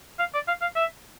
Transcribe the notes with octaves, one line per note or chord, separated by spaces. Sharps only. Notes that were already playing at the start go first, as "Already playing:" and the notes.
F5
D5
F5
F5
E5